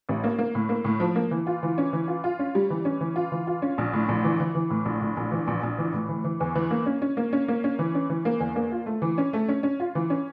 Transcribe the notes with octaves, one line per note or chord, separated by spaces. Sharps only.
A1
A#3
A#3
A2
A#3
A2
F3
A#3
E3
F4
E3
C#4
E3
F4
F4
C#4
G3
E3
C#4
E3
F4
E3
F4
C#4
A#1
A2
A#1
E3
E3
E3
A2
A#1
A2
A#1
E3
A#1
A#1
E3
A2
E3
E3
E2
E3
A#3
C#4
C#4
A#3
C#4
A#3
C#4
E3
C#4
E3
A#3
E2
A#3
F4
A3
E3
C#4
A3
C#4
C#4
F4
E3
C#4